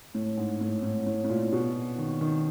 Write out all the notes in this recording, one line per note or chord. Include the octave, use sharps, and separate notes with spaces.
A2
G#2
A2
A2
A2
A2
A#2
B2
D#3
D#3